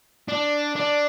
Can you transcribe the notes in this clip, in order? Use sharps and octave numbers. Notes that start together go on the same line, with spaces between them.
D4
D4